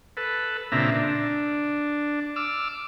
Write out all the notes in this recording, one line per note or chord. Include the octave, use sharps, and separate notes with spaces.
A4 B4
A#2 C#3 C4 D4 E5 A#5
D4
D6 E6 F6